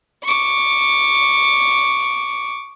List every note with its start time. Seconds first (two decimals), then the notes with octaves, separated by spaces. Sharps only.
0.24 C#6 D6